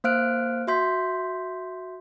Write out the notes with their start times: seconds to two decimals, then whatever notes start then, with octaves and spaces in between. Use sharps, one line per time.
0.04 A#3 C5 F5 F6 F#6 D7
0.67 F#4 E5 C6 G6 B6